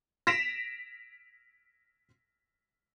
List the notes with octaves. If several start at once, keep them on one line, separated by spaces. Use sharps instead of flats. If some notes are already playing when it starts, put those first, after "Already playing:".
A#6 B6 D7 E7 F7